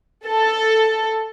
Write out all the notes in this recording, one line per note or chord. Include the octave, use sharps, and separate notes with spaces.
A4